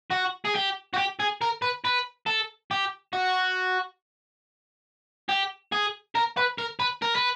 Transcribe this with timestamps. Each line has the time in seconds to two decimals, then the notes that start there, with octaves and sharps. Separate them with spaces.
0.11 F#4
0.45 G#4
0.55 G4
0.94 F#4
0.98 G4
1.20 G#4
1.42 A#4
1.62 B4
1.85 B4
2.27 A4
2.71 G4
3.13 F#4
5.29 G4
5.72 G#4
6.15 A#4
6.37 B4
6.58 A#4
6.80 B4
7.02 A#4
7.15 B4